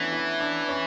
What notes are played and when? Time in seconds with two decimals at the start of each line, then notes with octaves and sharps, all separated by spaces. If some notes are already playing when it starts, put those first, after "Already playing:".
Already playing: E3 A3 B3 C#4 D4
0.12 E4
0.40 D4
0.69 C#4